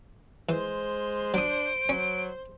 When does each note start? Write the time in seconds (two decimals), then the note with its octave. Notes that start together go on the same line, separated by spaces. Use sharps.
0.49 E3 G#3 C5
1.34 F#3 D4 D#6 D7
1.89 F#3 C#4